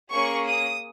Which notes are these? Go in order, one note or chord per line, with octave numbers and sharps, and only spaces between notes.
A#3 C#4 G#4 C#6
D#6